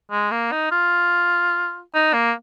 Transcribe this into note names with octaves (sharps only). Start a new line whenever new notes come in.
G#3
A#3
D#4
F4
D#4
A#3